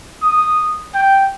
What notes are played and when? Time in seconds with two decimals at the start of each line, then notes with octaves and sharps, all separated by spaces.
0.22 D#6
0.94 G5